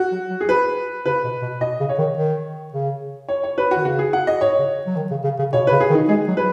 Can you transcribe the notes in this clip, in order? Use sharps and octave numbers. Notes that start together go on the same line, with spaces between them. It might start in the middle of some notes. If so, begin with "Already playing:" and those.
Already playing: F#4
F#3
F#3
G#4
B4
C#3 B4
B2
B2
B2 D#5
C#3
C#5
D#3
D#3
C#3
C#5
C#5
B4
F#4
D#3
C#3 F#4
G#4
F#5
D#5
G#2 C#5
C#3
F#3
D#3
C#3
C#3
C#3
B2 C#5
C#3 B4
G#4
D#3
D#4
G#3 G#4
F#3
B4